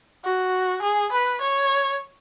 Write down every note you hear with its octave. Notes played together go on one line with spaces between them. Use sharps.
F#4
G#4
B4
C#5